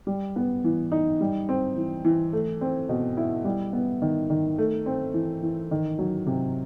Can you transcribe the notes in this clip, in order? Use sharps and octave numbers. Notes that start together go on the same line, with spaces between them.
G3
B3
E3
D#4
G3
C4
E3
E3
A3
C4
B2
E4
G3
B3
D#3
D#3
A3
C4
E3
E3
D#3
F#3
C3